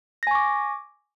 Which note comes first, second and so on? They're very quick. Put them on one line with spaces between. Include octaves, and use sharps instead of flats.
A#6 G#5 C#6 D6